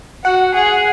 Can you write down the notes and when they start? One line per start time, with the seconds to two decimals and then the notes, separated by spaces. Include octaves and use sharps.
0.25 F#4 F#5
0.55 G#4